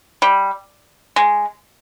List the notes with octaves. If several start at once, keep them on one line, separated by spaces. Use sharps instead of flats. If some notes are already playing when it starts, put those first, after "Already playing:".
G3
G#3